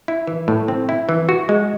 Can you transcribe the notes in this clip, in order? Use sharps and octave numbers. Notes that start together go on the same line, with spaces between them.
E4
E3
A2
C4
E4
E3
F#4
G#3